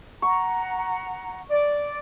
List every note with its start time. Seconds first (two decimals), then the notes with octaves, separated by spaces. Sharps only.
0.22 F#5 A#5 C#6
1.51 D5